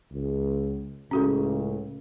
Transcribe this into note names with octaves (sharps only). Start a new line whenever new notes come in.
C#2
C#2 A2 C#3 C#4 F#4 A4